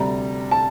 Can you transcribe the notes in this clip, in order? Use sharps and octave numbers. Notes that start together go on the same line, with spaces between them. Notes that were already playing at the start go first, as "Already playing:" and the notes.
Already playing: D2 C3 G3 A#5
A5